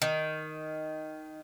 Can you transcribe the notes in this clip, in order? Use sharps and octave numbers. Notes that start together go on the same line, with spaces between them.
D#3